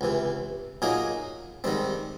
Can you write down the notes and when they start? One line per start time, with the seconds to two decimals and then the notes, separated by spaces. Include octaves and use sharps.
0.01 C#2 C3 E3
0.82 A#2 F#3 A#3 D#4 G#4
1.64 G#2 D#3 G3 C4